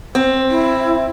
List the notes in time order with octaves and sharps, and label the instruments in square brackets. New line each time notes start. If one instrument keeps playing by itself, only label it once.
[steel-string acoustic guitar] C4 [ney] C5
[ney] E4